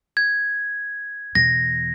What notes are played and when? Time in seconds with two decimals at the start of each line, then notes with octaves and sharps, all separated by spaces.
0.17 G#6
1.35 E2 B2 A#6